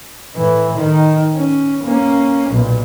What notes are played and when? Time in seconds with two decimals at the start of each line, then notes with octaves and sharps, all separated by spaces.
0.35 A2 E3
0.77 D#3
1.35 C#4
1.83 A#3 C#4
2.49 B1 A#2